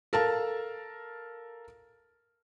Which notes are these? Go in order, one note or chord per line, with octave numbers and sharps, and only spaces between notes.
A4 A#4 F5 A5